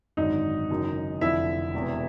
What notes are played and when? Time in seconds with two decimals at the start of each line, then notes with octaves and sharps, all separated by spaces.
0.17 G#1 F#2 D3 D#4 D#5
0.70 F#1 F#2 D#3
1.21 F1 F2 D3 F3 E4 E5
1.74 E1 E2 C3